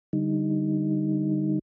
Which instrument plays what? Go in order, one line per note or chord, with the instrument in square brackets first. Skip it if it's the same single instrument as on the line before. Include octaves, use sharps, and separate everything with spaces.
[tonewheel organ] D3 G3 D#4